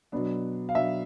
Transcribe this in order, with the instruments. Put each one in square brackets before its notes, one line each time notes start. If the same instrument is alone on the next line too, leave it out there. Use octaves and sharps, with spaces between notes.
[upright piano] B2 F#3 B3 D4
[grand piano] F5
[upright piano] B2 F#3 B3 D4 [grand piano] E5